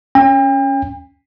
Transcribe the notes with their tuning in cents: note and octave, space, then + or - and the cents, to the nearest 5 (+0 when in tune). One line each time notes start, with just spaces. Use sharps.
C#4 +0 G5 +40